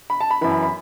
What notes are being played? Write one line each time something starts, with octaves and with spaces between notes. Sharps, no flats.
B5
A5
B5
F#2 E3 B5
B5
B5